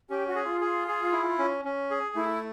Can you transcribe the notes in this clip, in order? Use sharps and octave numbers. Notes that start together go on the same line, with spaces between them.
C#4 G4
F#4
G#4
F4
G#4
G#4
E4
C#4
C#4
G#4
A3 E4